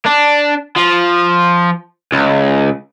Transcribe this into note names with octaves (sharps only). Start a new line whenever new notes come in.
D4
F3
C#2